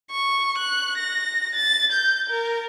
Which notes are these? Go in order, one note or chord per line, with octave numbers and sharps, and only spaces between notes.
C#6
F#6
A#6
A6
G6
A#4